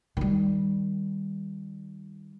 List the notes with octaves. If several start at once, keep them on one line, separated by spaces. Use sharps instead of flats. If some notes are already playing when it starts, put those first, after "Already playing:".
D#3 G3